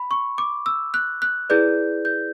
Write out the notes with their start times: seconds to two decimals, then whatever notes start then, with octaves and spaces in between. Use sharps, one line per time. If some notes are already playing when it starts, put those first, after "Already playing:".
Already playing: B5
0.11 C#6
0.38 D6
0.66 E6
0.94 F#6
1.22 F#6
1.50 E4 G#4 B4 D5 G6
2.05 G6